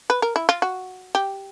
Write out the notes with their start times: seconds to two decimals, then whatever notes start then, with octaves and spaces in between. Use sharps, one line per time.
0.10 B4
0.22 A#4
0.36 E4
0.49 F4
0.62 F#4
1.15 G4